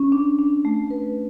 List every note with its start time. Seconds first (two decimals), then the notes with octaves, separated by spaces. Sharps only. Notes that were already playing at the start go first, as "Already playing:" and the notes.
Already playing: C#4
0.12 D4
0.39 D4
0.65 A3
0.90 B4